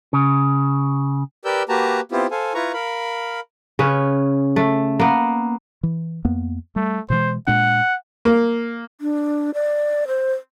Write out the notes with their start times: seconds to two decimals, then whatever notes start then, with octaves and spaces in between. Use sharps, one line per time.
0.13 C#3
1.45 G4 A#4 B4 D5 E6 G6
1.69 A#3 F#4 G4 B4 A5 A#5
2.12 B3 C4 E4 F4 G4 C5
2.31 A4 C5 F5 G#5
2.54 E4 F4 B4 A#5 C#6
2.73 A#4 F5 B5
3.79 C#3 C#4 B4
4.56 A3
4.99 A#3 B3
5.83 E3
6.25 F2 A#3 B3
6.76 G3 A3
7.10 B2 E3 G#3 C5
7.47 A#2 G#3 D4 F#5
8.25 A#3
9.01 D4
9.54 D5
10.08 C5